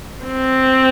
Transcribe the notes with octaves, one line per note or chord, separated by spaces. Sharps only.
C4